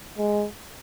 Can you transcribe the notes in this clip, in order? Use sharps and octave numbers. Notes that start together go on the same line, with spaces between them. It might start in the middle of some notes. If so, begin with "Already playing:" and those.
G#3